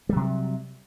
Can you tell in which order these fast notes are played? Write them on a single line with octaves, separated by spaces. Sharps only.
G3 F#3 C3